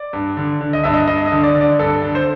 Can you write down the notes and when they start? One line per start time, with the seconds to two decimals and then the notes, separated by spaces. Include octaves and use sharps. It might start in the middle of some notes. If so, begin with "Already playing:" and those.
Already playing: D5
0.13 G2
0.37 D3
0.61 D3
0.73 D#5
0.84 G2 E5
0.94 D#5
1.08 G2 D#5
1.26 D#5
1.32 D3
1.43 D5
1.55 D3
1.61 D5
1.79 G2 A4
2.02 D3
2.15 C5